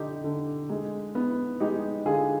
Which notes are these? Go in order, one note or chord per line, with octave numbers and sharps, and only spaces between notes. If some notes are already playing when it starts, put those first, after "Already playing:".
Already playing: D3 D#4 G4
D3
G#3
B3
G#3 D#4 G4
D3 F4 G#4